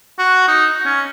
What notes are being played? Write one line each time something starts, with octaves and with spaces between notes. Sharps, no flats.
F#4
D#4
C#4